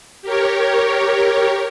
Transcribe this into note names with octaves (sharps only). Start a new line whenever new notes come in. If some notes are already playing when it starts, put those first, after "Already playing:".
G4 A#4 C#5